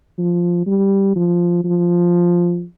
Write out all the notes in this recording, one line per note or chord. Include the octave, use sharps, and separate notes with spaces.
F3
G3
F3
F3